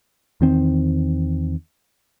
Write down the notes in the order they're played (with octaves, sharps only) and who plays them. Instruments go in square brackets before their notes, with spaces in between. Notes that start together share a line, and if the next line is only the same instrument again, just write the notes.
[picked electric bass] E2 D#3 C4